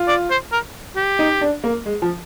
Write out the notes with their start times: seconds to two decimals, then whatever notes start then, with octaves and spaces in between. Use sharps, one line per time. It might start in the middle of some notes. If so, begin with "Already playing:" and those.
Already playing: F4
0.08 D5
0.30 C5
0.52 A#4
0.96 G4
1.19 D#4
1.41 D4
1.64 A#3
1.86 G#3
2.02 F3